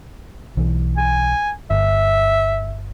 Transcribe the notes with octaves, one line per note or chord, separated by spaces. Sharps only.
B1 E3
G#5
G1 E5